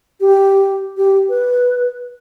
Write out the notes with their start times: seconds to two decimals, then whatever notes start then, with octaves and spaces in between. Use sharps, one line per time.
0.20 G4
0.97 G4
1.29 B4